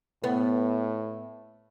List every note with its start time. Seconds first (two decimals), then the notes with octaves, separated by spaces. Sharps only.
0.24 A2 B3